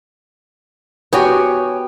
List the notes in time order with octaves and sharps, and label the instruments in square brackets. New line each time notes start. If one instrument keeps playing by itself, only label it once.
[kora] B3 F#4 G4 [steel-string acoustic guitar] C#5 G5 G#5